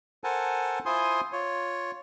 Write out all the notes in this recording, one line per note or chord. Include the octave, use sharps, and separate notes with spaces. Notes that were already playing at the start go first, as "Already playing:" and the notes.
A4 A#4 C5 F#5 G#5 A5
E4 F4 C5 G#5 C6 D#6
F4 C#5